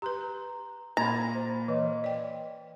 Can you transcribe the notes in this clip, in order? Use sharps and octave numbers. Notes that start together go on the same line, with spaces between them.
G4 B4 A#5 C6 F#6
A#2 A#5 B5 G#6 A6
C5
E3 B4 C#5 D#5
D5 G5